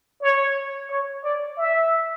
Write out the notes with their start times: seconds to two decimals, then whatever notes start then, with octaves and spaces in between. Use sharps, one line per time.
0.21 C#5
0.90 C#5
1.24 D5
1.58 E5